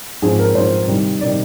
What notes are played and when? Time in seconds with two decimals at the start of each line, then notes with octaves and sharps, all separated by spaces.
0.22 G#2 F3 C4 G#4
0.39 A#4
0.54 G#2 F3 C4 C5
0.87 C3 D#3 G3
1.21 C3 D#3 G3 D5